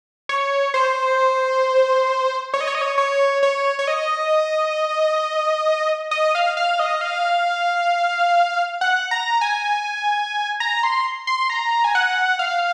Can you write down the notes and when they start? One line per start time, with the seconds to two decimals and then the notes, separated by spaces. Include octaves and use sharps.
0.29 C#5
0.74 C5
2.54 C#5
2.61 D#5
2.67 C#5
2.75 D#5
2.81 C#5
2.98 C#5
3.43 C#5
3.79 C#5
3.87 D#5
6.11 D#5
6.35 F5
6.57 F5
6.79 D#5
7.01 F5
8.81 F#5
9.11 A#5
9.41 G#5
10.60 A#5
10.83 C6
11.27 C6
11.50 A#5
11.84 G#5
11.95 F#5
12.39 F5